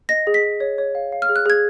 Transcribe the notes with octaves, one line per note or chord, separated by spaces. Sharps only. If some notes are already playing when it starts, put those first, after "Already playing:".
D#5 A#6
G#4
B6
G#4
C#5
C#5
F5
F5
F6
G#4
F#6
G#4 G#6